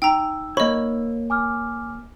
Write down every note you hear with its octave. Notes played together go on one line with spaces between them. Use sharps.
D#4 G5 A#5 E6
A#3 C#5 D#5 B5
G#5 D6 F6